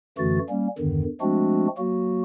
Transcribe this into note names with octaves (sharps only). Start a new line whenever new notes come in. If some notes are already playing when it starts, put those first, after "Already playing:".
F#2 D3 E3 A3 F#4 A6
G3 A#3 C#4
E2 G2 D3 D#3
F3 G#3 A3 C4 D4 F#4
F#3 A#3 F#4